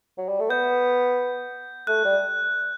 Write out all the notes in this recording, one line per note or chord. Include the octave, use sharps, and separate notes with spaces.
F#3
G3
A3
B3 G6
A3 F#6
G3